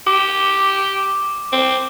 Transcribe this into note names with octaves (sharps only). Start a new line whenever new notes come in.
G4 D6
C4